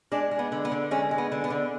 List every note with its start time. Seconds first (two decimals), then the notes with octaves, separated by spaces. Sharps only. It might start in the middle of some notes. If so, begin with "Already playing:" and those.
0.12 G#3 D4
0.31 G#3
0.39 B3
0.52 D3
0.65 B3
0.72 D3
0.91 G#3 C#4
1.11 G#3
1.18 B3
1.32 D3
1.44 B3
1.50 D3